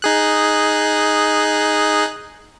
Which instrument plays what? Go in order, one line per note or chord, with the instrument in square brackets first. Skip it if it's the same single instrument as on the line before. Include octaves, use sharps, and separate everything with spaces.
[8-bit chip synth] D#4 G#4 F#6